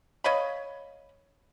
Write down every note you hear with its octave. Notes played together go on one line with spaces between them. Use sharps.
C#5 D#5 F5 B5